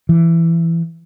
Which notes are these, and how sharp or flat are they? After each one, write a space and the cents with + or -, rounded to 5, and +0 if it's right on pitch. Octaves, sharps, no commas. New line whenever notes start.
E3 +15